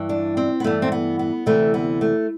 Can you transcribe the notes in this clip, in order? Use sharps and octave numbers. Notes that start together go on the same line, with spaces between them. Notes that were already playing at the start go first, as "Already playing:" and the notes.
Already playing: G2 E3
D4
C4
B3
G2 E3 A3
C4
B3
B3
D2 C3 E3 A3
B3
A3